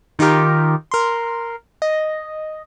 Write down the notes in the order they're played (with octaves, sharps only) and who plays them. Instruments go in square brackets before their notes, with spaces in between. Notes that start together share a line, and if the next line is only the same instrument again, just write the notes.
[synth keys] D#3 D#4 F4 G4 A#4
A#4 C6
D#5